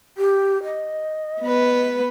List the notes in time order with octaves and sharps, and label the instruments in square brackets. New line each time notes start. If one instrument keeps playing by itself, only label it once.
[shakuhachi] G4
D#5
[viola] B3 B4